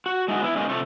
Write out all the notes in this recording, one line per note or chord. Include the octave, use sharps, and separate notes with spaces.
F#4
G#3 A3 D#4 F#4
B3 E4
B2 G#3 A#3 C#4 D#4
C3 F3 A3 C#5